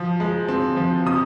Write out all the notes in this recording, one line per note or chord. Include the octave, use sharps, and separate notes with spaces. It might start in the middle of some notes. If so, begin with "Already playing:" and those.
Already playing: F3
G#3
C4
F3
C3 D#6